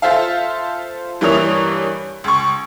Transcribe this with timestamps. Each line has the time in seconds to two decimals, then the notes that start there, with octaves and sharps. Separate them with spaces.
0.02 F4 A4 C5 E5 F5
1.21 G2 E3 A#3 C#5 D#6 F7
2.24 C#2 C#6